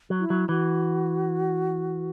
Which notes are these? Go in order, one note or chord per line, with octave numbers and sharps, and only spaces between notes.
F#3
E4
F#3
E3 F#4